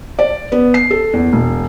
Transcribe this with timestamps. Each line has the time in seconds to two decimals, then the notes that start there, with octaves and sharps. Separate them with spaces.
0.19 D5
0.52 B3
0.74 C7
0.91 A4
1.13 E2
1.33 E1